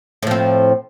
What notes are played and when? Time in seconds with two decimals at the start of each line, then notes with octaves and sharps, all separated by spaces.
0.23 A2
0.27 F3
0.31 C4